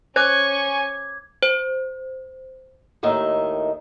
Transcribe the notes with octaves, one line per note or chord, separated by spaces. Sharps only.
C#4 C5 G#5 C#6 D6 G#6
C5
D#2 A2 D#3 D#5 E5